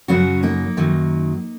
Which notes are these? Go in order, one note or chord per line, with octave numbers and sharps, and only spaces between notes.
F#2 C#3 F#3 C#4 F#4
A#3 D#4
F#2 D#3 F#3